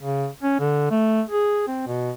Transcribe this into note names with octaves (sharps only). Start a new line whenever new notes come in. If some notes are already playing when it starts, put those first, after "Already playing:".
C#3
C#4
D3
A3
G#4
C4
B2